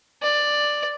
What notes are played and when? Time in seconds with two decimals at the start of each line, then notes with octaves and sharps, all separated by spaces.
0.23 D5